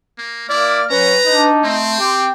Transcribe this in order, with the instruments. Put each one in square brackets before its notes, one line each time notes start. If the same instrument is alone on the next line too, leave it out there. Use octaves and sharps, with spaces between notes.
[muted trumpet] A#3
[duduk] A#3 [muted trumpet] E4 [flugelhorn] D5 [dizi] F6
[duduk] F#3 [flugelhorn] C#4 [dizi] B4 [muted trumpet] A#5
[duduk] D4 [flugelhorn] D#4
[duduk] A3 [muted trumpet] C4 [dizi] C6
[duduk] G4 [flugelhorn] G5